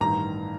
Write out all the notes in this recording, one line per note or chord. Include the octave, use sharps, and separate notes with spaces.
A1 G2 D#3 A#5